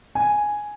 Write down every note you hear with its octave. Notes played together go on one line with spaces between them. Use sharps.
G#5